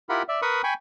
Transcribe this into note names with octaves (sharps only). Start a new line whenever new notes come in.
E4 F4 G4 A#4 F#5 B5
D5 E5
A#4 B4 B5 C#6 D#6
G5 G#5 B5 C#6